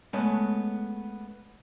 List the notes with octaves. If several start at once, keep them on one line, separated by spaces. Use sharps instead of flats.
G#3 A3 B3 C#4